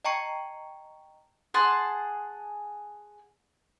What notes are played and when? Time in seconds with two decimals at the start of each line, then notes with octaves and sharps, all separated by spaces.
0.05 D#5 G5 A5 A#5 C#6 C#7
1.54 G#4 F#5 A5 C6